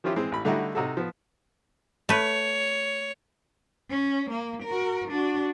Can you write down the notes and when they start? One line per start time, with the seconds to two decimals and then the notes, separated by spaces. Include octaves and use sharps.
0.04 D#3 F3 C#4 E4 F4 G4
0.16 E3 G#3 C4
0.32 A1 B5
0.45 D3 G3 A3 D#4 E4 F#4
0.75 C3 D#4 F#4 A4
0.97 F3 B3
2.09 A3 B4 C#5
3.90 C#4
4.30 A#3
4.63 F#4 A#4
5.08 D4 F#4